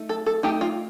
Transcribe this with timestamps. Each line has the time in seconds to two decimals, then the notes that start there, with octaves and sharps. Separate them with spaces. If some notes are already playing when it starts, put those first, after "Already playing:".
Already playing: A3 D#4
0.09 A4
0.26 A4
0.43 A3 D#4 G4
0.61 F4